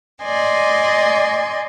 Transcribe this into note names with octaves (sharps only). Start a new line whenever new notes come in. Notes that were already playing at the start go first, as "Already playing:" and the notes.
D5 D#5 G#5 C6